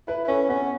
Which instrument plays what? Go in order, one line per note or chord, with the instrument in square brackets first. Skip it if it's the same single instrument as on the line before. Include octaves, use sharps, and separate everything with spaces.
[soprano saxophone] E4 [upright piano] B4
[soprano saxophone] E4
[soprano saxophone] C#4 [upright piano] A4
[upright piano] B3 [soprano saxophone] C#4